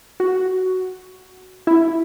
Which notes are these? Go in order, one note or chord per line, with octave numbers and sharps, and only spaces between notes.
F#4
E4